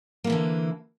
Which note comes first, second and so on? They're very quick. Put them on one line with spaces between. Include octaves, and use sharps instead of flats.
A#3 E4 E3 D3